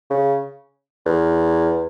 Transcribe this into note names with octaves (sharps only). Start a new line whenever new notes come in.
C#3
E2